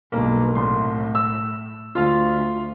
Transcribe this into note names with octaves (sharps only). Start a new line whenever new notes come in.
B1 G2 A#3
C2 A2 C6
E6
D2 F4 F5